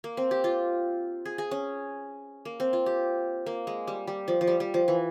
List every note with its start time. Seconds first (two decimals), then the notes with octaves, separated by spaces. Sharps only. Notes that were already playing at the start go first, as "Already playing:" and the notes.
0.04 A#3
0.17 C4
0.31 G4
0.44 F4
1.25 G#4
1.38 G#4
1.51 C#4
2.45 A#3
2.60 C4
2.73 F4
2.86 G4
3.46 A#3
3.67 G#3
3.88 G3
4.07 G3
4.28 F3
4.41 F3
4.47 G3
4.60 G3
4.74 F3
4.88 E3